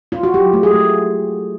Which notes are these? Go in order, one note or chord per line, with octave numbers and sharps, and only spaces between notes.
F4
F#4
F#3 G4
A3
G#4
A3